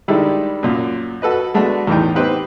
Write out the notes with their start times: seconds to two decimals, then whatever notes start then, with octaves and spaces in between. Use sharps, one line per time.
0.08 D#3 G3 G#3 D4 E4 A4
0.63 F#2 A#2
1.22 F#4 A4 B4 D#5
1.54 G#3 A3 B3 D4 F#4
1.87 E2 A2 E3 D#4 G5
2.16 B3 C4 D#4 G4 B4 C5